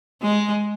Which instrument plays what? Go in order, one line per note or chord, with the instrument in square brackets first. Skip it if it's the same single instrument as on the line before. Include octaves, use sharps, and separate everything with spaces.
[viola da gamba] G#3